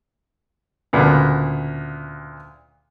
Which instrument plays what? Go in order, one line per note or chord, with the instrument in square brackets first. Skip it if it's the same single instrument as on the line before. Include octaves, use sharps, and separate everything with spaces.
[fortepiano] D2 A#2 C#3 B3